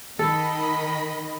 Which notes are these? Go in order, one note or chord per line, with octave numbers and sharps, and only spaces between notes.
D#3 A4 D#5 B5